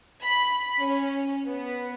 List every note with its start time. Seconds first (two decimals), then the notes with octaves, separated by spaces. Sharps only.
0.23 B5
0.77 C#4
1.46 B3